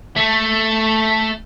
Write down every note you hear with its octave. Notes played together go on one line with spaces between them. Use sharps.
A3